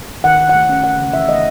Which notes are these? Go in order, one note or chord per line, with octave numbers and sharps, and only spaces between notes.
D#3 F#5
D#3
F#5
A3
C#4
C#4 F#5
C#3
E3 E5
A3 D#5